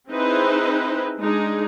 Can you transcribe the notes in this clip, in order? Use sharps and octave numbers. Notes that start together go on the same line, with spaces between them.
C4 D#4 E4 G#4 B4 C5
G#3 D4 D#4 G#4